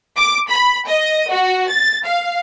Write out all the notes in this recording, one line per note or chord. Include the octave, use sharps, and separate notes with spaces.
D6
B5
D#5
F#4
A6
F5